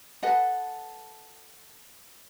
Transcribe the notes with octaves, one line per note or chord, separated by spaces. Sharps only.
A4 B4 D#5 F#5